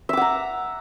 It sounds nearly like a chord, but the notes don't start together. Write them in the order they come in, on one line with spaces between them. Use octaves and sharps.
E5 D6 F#5 A#5